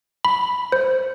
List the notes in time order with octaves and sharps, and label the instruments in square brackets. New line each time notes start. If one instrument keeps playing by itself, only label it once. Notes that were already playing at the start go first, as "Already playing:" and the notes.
[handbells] B5
C5